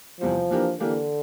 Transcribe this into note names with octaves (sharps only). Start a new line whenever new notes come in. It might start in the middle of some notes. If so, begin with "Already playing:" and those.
E2 C3 F3 G3 C4
E3 A#3 D4 G4 A#4
D3 E3 A#3 D4 G4 A#4